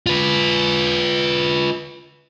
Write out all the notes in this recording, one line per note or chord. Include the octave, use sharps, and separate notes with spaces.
F4 B4